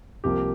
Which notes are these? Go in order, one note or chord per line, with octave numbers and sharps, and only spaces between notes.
C2 C3 F3 A#3 G4